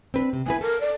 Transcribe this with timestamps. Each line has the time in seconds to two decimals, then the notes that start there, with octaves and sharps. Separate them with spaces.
0.14 C4 D4 B4
0.33 C3
0.46 B3 E4 B4 G#5
0.61 A4 A#4
0.81 D5